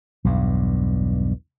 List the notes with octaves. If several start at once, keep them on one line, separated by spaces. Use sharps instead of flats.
B1 E2 G2